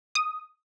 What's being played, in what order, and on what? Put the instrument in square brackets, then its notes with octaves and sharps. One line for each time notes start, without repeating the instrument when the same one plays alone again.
[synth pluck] D#6